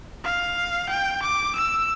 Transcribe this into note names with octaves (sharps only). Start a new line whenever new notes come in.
F5
G5
D6
E6